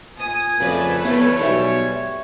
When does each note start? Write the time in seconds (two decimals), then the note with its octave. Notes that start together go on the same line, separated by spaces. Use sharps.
0.19 A#2 G#5 D#6
0.60 F2 C#3 A3 G#4 B4 D5
1.05 E2 G3 B3 E4 C#5
1.39 B1 G3 G#3 E5